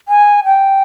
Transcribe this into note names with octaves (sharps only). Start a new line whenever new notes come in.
G#5
G5